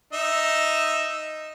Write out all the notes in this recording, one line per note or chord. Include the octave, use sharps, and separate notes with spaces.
D#4 E5